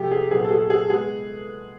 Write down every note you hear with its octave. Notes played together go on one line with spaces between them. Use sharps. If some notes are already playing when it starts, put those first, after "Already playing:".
Already playing: C3 F3 A3 G4
G#4
A#2 F#3 B3 G#4
A4
G#4
G#4
G#3 B3 G#4